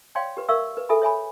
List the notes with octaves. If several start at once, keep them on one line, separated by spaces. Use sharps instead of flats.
C#5 D5 F5 G5 C6
G4 B4
A#4 D5 E5 F5 C#6 E6
B4
G#4 A4 E5 G#5 B5
C#5 E5 G#5 B5